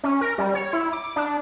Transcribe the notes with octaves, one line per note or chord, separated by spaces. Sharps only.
C#4
A#4
G3
C#5
E4
D6
D4